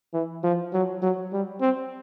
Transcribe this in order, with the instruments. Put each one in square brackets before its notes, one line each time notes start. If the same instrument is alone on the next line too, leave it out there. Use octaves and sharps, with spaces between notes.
[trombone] E3
F3
F#3
F#3
G3
C4